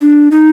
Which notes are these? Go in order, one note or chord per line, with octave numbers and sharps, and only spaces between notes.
D4
D#4